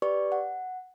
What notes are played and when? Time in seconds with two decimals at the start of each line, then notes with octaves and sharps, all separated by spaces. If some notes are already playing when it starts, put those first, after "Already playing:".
0.02 G4 B4 D5 C#6
0.32 F#5